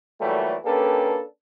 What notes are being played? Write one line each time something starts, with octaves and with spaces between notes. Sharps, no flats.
A#2 E3 F#3 G3 A3
A#3 C#4 D4 G4 A4 B4